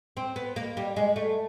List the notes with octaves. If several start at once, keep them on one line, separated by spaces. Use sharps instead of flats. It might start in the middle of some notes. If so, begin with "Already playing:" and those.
C4
B3
A#3
G3
G#3
A3